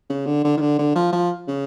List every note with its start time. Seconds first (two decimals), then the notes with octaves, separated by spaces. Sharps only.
0.10 C#3
0.26 D3
0.45 D3
0.57 D#3
0.61 D3
0.79 D3
0.95 F3
1.12 F3
1.48 C#3